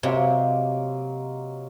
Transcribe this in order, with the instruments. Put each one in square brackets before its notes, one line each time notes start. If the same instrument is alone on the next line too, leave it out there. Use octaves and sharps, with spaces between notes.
[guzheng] C3 [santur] F#3 G#3 A#3